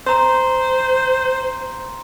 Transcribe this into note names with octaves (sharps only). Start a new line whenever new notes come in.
C5 A#5 C6